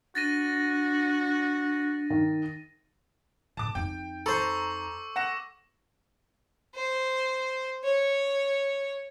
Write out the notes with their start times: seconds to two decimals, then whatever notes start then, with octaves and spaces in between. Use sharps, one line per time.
0.15 D4 F#4 A6 A#6 D#7
2.10 D#3
3.57 A2 D3 A5 D6
3.75 F2 D#4 G5
4.26 A4 C5 A#5 C#6 D6 E6
5.16 F#5 A#6 E7
6.75 C5
7.84 C#5